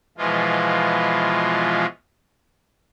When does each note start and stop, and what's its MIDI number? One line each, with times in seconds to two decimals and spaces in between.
0.18 1.86 47
0.18 1.86 52
0.18 1.86 53
0.18 1.86 56
0.18 1.86 65